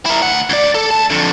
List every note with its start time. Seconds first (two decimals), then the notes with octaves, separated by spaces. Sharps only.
0.06 E4 A#4
0.22 D2 F#5
0.50 C#2 D5
0.75 A4
0.91 D2 A5
1.10 F2 D3